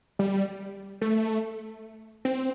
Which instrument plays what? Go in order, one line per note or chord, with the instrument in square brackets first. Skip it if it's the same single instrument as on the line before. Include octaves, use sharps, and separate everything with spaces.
[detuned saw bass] G3
A3
C4